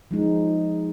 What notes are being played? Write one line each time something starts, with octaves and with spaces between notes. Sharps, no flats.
F3 G#3 D#4